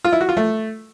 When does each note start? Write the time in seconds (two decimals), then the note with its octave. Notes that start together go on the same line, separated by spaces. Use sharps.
0.04 F4
0.13 E4
0.21 F#4
0.29 F4
0.37 A3